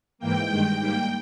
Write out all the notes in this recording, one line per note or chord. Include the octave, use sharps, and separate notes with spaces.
G#2 E3 A#3 G5
G2 D#3 G#3
G#2 G3 A#3 G5